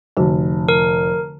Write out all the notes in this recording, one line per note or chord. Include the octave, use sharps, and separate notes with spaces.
F1 D3 F#4
A#4